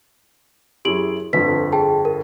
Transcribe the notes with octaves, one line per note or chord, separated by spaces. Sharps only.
F#2 E4 G4 G#4 D7 F#7
G1 F2 D3 B4 B6
G#4 G5 A5
A#4